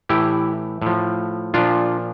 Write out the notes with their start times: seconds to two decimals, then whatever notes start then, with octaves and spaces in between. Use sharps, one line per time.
0.09 A2 E3 E4 G4
0.82 A2 F3
1.54 A#2 F3 D4 F4